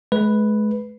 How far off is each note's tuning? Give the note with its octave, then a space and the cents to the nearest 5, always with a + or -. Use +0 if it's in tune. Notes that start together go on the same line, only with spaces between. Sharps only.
G#3 +40 B4 +0